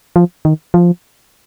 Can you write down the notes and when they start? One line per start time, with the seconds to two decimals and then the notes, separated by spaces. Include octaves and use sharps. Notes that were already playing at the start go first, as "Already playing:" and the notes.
0.16 F3
0.45 D#3
0.74 F3